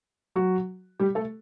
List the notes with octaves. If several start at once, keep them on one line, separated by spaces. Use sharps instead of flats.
F#3 F#4
G3 G4
A3 A4